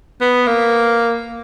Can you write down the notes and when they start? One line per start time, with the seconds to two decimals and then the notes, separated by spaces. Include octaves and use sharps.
0.21 B3
0.47 A#3